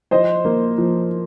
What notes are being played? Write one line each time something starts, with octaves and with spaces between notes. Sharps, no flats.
F3 C5 D#5
A#3
F3